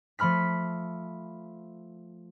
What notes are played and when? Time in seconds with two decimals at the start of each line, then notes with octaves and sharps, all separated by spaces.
0.19 F3 A3 B5 F6 B6